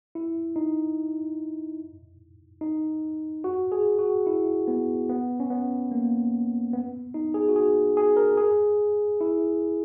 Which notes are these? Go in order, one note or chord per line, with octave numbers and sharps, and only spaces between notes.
E4
D#4
D#4
F#4
G#4
F#4
E4
B3
B3
C#4
B3
A#3
B3
D#4
G#4
F#4
G#4
G#4
A#4
G#4
E4